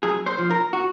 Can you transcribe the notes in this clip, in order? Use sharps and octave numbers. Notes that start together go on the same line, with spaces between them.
F#2 G#4
C5
F3
A#4
F#4